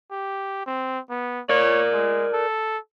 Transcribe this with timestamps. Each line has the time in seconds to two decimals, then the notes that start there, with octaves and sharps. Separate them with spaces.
0.11 G4
0.67 C4
1.10 B3
1.49 A#4 C#5 D5
1.93 G#3
2.33 A4